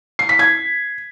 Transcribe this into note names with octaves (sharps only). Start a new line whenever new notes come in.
C7
B6
G#6